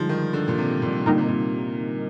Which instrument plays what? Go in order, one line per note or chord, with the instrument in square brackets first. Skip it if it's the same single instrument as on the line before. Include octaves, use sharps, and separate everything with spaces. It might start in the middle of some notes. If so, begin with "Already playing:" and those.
Already playing: [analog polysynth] D3 G3 D#4 [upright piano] F3 G#3
[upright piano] D#3
D3
A#2
C3
A#2
[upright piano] A#2 [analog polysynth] D3 G3 A#3 D#4 A#4
[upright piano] C3
A#2